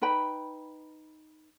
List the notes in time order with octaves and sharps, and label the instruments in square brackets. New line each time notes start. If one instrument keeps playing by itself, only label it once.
[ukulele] D#4 B4 G5 B5